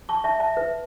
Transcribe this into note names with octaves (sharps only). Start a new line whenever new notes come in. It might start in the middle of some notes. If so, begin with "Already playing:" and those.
A5 C#6
E5 A5
E5 A5
B4 E5